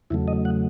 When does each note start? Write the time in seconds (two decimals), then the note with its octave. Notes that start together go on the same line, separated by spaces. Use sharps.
0.10 E2 C#3 F#3 A3 E4
0.28 D#5
0.45 F#5